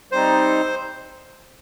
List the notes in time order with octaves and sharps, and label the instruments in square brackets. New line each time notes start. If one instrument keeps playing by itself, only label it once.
[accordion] G3 C4 D#4 [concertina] C5